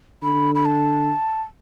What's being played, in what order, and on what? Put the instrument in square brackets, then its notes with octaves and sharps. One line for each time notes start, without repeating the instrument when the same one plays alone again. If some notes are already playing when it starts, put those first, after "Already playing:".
[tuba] D3 [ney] B5
[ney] B5
A5